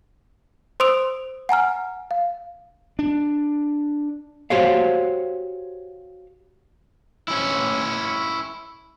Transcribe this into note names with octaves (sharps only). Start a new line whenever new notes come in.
C5 C6 D#6 E6 D7 F7
F#5 G#5 A#5 F6
F5
D4
F#4 G4 C5 C#5 F5
C#4 E4